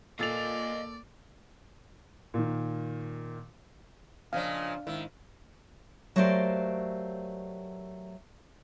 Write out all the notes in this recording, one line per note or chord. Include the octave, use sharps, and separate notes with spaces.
A#2 A#3 A4 D5 D#5 F5 A6 F7
A#2 D#3
A#2 C#3 F3 C#4 D4 D#5 F5 G#5
G#2 D#3 E4 E5
F#3 A3 A#3 G4 C5 D5